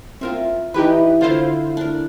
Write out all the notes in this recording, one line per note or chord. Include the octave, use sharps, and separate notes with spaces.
C4 F4 A#4 E5
E3 D#4 G4 B4
D3 E4 F4 C5 F5
D4 A#4